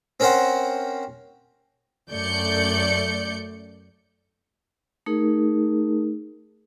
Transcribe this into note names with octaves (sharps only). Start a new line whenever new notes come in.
C4 C#4 A#4 C5 F#5
F#2 A3 D5 G6 C#7
A3 D#4 G#4 A#4